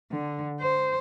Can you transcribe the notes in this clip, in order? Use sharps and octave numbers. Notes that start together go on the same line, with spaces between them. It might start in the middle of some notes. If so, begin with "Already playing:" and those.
D3
C5